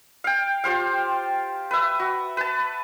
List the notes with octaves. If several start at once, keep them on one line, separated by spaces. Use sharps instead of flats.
F5 G5
F4 G4 C5 F5
B4 E5
F#4
B4 A5